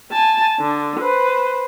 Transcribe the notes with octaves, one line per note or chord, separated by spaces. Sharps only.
G#5 A5
D3
B4 C5